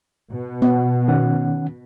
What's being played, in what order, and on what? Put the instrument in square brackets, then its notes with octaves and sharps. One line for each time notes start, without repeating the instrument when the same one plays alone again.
[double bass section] B2
[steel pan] B3
[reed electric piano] D#3 C#4 F#5